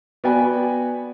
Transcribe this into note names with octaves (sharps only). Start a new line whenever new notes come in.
B3 F#4 D5 G5 G#5 B5